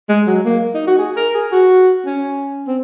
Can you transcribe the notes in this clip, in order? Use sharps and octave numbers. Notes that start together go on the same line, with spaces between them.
G#3
F#3
A#3
D#4
F#4
G#4
A#4
G#4
F#4
C#4
C4